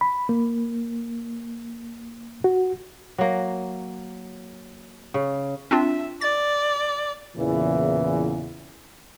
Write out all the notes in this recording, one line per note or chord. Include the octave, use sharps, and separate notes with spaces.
B5
A#3
F#4
F#3 A#3
C#3
C4 D4 F4 E5
D5 A6
E2 A#2 C#3 E3